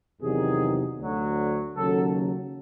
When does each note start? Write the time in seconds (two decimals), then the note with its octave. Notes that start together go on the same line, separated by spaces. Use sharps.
0.22 E2 C3 D#3 F#3 G#4
0.99 D2 D3 F#3
1.76 D#2 C#3 F#3 A4